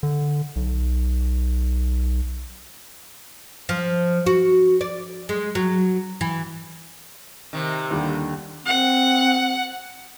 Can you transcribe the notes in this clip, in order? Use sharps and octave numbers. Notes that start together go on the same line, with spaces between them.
D3
B1
F3
F#4
D5
G#3
F#3
E3
C3 D#3
D#2 D3 G3
C4 F#5